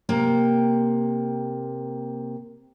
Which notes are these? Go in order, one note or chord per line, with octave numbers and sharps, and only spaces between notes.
C3 A#3 G5